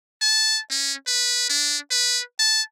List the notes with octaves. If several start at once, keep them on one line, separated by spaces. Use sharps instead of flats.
A5
C#4
B4
D4
B4
A5